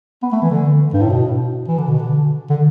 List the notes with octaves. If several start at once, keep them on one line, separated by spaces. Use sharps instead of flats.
B3
A3
E3
D3
G2
A2
B2
E3
D3
B2
D3
D3